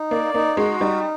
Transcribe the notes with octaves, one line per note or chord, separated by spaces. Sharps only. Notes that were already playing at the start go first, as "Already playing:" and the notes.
Already playing: D#4
A#3 D5
A#3 D#4
G#3 F#4
G3 D#4